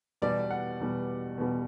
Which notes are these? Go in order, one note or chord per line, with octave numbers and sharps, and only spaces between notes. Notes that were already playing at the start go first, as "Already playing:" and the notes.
E2 B2 G3 D5
F#5
E2 B2 G3
E2 B2 G3